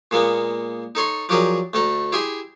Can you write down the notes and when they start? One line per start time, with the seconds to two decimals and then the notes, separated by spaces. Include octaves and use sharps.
0.11 A#2 G#3 A#3 B3
0.95 D#4 A4 C#5 C6
1.29 F3 F#3 D4 G4 G#4 A#4
1.73 D2 A3 A4 A#5
2.12 E4 G4 G#4 E5 C6